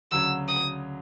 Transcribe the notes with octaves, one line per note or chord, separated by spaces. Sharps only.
D2 C#3 F#3 E6
D#6